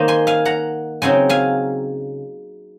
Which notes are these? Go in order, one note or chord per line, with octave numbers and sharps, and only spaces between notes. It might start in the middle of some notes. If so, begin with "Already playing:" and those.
Already playing: D#3 A#3 D#4 C5 D#5
G#5 C6
F5 G#5
F#5 A#5
C#3 F#3 C4 D#4 G#5 C6
F5 G#5